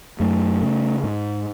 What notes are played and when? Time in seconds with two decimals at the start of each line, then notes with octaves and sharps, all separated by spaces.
0.20 F#2 A3
0.62 C#3
1.03 G#2